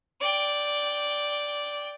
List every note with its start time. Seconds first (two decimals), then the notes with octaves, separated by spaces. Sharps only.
0.20 D5 G5